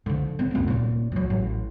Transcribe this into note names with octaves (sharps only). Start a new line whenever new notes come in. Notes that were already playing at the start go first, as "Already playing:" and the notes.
D3 F3
C4
F#1 D2
D#1 A#2
F3 F#3
A1